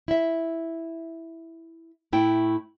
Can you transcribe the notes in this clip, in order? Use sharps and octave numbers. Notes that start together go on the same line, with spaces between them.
E4 E5
A2 A3 E4 G5